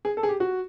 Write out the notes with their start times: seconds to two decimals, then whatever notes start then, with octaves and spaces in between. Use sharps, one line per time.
0.05 G#4
0.17 A4
0.23 G#4
0.29 G4
0.40 F#4